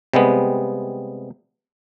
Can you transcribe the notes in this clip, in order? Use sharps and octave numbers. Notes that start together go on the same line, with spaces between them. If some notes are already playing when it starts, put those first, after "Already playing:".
C3 G3 G#3 B3